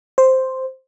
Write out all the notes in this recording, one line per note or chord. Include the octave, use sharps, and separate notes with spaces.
C5